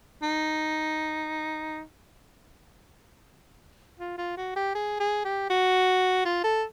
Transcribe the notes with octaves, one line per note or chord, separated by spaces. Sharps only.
D#4
F4
F4
F#4
G4
G#4
G#4
G4
F#4
F4
A4